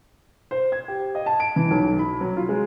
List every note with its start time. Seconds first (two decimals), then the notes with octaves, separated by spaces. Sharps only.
0.51 C5
0.72 G#6
0.88 G4
1.15 D#5
1.26 A5
1.40 D7
1.56 E3
1.71 B1
1.99 B5
2.21 F#3
2.36 F4
2.49 G#3